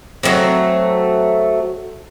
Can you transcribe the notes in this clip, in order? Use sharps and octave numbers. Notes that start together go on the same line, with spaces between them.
F#3 G#3 A3 C4